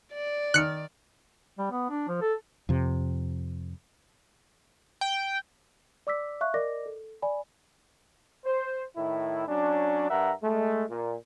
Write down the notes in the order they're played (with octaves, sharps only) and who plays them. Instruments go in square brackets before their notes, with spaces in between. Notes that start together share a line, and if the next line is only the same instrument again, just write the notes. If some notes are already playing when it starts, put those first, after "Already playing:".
[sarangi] D5
[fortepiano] D#3 F6 [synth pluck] F#6 C#7
[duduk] G3
B3
D4
F3
A4
[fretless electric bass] F2 C3
[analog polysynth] G5
[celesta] D5 D6 E6 B6
E5 F5 C#6 F#6
A#4 D5 D#5 D6 A#6
A4
D5 G#5 B5
[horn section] C5
A2 D#3 E4
F#3 C#4 D4
G2 A#4 E5 F#5 A#5
G#3 A3
A#2